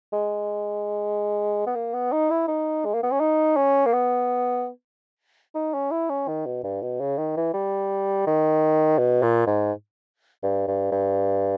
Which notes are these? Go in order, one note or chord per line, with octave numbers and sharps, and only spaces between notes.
G#3
B3
A#3
B3
D#4
E4
D#4
G#3
A#3
B3
C#4
D#4
C#4
A#3
B3
D#4
C#4
E4
C#4
D#3
B2
G2
B2
C#3
D#3
E3
G3
D#3
B2
A#2
G#2
G2
G2
G2